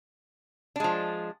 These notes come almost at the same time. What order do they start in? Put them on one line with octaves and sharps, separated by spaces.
D4 G#3 F3